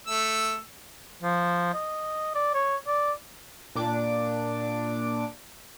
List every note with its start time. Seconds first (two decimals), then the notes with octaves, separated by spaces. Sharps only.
0.07 A3 E6
1.23 F3
1.74 D#5
2.35 D5
2.54 C#5
2.87 D5
3.75 A#2 D4 D6